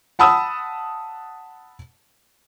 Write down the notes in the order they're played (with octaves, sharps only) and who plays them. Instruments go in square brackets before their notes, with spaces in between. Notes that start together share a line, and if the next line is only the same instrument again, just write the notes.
[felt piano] F#5 A5 B5 D#6 E6